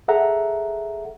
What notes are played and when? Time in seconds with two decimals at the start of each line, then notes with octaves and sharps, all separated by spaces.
0.08 G#4 A4 E5 F#5 A#5